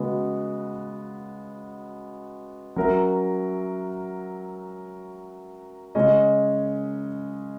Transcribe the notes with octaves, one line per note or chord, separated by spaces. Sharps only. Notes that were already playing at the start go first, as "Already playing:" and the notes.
Already playing: C#3 G#3 B3 F#4
F#3 C#4 F#4 A#4 E5
C#3 G#3 C#4 G#4 D#5